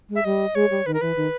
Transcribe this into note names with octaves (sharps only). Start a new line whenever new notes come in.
G#3
E5
G3 D#5
G#3 C#5
G3
D#3 B4
A#4
E3 B4
D#3